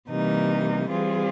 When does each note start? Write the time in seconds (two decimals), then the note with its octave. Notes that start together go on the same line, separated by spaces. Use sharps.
0.10 C3 E3 G3 A#3 D#4
0.89 E3 G3 C4 F4 G#4